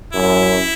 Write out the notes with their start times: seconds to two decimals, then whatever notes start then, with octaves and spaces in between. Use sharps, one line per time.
0.13 F#2 E4